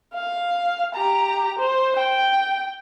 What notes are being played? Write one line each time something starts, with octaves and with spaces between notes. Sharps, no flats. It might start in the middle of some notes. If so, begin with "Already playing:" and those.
F5
G4 A#5
C5
G5